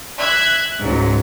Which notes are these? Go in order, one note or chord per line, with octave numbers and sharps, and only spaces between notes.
E5 F#6 G#6
C#2 G#2 F#3